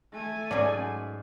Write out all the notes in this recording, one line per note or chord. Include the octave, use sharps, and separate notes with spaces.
A3 G#5
G#2 F#3 C#4 D5